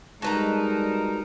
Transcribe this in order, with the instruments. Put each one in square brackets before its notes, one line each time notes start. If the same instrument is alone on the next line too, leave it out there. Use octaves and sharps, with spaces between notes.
[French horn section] G3 G#3 [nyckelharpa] D#4 A#4 [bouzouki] F#4 B4 A#5 [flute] A5